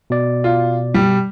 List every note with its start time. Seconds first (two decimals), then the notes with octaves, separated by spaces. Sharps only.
0.10 B2 D5
0.44 F4
0.94 G3